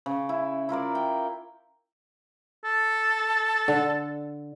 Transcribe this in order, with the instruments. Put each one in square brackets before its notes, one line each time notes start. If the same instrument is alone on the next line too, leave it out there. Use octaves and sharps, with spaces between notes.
[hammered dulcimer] C#3
E4
E4 F4 A#4 D5
G5
[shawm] A4
[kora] D3